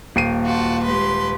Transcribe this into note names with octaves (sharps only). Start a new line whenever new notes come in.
D#1 A#3 G5 C7 D#7
F4 F#4 A5
G#3 G4 B4 C6